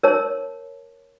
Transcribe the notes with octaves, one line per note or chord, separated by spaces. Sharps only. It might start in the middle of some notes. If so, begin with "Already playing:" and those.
A#4 C#5 A5